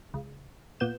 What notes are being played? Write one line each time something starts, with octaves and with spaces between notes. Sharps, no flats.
C#2
A#2 B3 G6 E7